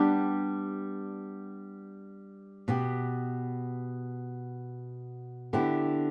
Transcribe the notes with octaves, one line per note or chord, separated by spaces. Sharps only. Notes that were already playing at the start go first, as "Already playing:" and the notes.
Already playing: G3 B3 D4 G4
B2 B3 G4
D3 B3 E4 G4